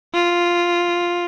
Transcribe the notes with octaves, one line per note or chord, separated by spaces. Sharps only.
F4